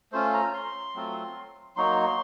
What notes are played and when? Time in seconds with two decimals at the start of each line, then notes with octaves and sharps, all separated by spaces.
0.12 A3 C#4 F4 C5
0.34 A#5
0.54 C6
0.95 F#3 A3 C4 F4
1.76 F#3 A#3 D#4 F#4 C6